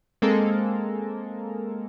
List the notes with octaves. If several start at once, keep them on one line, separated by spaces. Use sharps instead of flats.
G#3 A#3 C4 A4 A#4